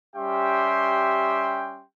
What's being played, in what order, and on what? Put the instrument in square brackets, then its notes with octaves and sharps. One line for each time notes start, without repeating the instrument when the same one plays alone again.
[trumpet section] G3 C#4 G4 E5 G5 C6